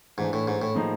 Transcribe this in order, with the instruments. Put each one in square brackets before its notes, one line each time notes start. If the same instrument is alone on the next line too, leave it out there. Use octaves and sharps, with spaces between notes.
[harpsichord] G#2 [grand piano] E3 A3 D4
[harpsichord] A2
G#2
A2
[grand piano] A2 F3 A#3 D#4 G#4